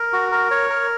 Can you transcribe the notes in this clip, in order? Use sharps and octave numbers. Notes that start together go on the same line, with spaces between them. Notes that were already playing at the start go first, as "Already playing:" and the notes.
Already playing: A#4
F#4
A#4
C#5
A#4